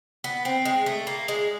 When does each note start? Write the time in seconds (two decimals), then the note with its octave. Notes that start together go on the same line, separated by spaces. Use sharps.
0.24 B3
0.45 C4
0.65 G#3
0.86 A3
1.07 A#3
1.28 G#3